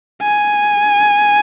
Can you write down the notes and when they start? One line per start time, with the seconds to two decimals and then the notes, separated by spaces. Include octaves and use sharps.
0.22 G#5